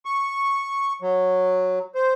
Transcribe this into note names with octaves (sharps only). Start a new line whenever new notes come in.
C#6
F#3
C5